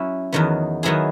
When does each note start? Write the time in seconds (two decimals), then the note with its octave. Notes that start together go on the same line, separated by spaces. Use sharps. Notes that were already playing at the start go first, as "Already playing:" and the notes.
Already playing: F#3 C#4 E4
0.32 E2 D#3 F#3 B3
0.83 D#3 F#3 B3 E4 G#4